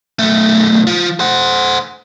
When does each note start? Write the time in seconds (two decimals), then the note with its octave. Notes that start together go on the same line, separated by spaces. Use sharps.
0.19 B1 A3
0.87 F3
1.20 C5 F#5